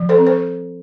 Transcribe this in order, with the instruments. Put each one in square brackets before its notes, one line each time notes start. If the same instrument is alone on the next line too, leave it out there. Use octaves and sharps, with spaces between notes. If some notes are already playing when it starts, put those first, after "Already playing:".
Already playing: [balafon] F3
A4 C5
C4
C5